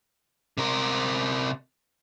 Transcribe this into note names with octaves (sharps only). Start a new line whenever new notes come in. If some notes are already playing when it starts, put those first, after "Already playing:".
C3 A#4